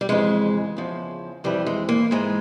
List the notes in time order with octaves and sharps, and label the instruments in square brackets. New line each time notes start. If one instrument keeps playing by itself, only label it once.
[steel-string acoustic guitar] G3
F2 C#3 E3 G#3
E2 C#3 F3
F2 E3 G3
G#3
A#3
G#2 E3 G#3